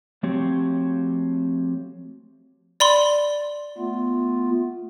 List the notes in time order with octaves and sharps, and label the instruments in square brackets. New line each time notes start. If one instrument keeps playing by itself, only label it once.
[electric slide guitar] F3 A3 C4 F#4 G4 C#5
[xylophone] D5 B5 C6
[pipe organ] A3 B3 F4